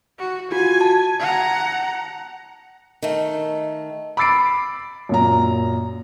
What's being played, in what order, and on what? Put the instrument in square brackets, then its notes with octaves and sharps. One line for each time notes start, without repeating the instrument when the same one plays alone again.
[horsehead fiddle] F#4
[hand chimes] F4 F#4 [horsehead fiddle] G#5
[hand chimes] A5
[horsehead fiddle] F#5 A#5
[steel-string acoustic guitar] D#3 A3
[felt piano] B5 D6 E6 A6 C7 D7
F#2 A#2 A#5